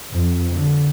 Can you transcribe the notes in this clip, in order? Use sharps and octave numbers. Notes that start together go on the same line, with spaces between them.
F2
D3